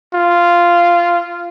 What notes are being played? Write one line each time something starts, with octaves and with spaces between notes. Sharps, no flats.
F4